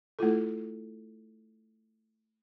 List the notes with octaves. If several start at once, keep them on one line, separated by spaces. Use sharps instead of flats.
A3 E4 F4 A4